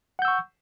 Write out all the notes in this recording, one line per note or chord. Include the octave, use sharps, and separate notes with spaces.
F#5 C#6 E6 G6